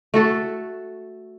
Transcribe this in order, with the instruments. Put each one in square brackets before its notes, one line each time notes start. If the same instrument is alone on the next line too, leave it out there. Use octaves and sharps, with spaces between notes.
[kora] A3 F#4 A4